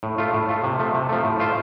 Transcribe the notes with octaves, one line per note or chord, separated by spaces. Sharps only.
A2
A3 F4
A2
A3 F4
C3
F3 A3
C3
F3 A3
A2
A3 F4 C5